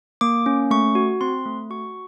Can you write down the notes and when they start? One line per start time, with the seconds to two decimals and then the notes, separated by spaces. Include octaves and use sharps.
0.21 A#3 D6
0.46 C#4
0.71 A3 C#6
0.95 F#4
1.21 C4 C6
1.45 A3
1.70 F#4 C#6